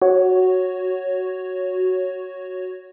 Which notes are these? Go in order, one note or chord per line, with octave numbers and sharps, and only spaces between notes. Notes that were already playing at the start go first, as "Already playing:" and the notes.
F#4 C#5